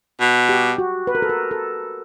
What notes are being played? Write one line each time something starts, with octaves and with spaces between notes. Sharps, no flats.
B2
G4
F#4
B4
A#4
A4
A#4
A4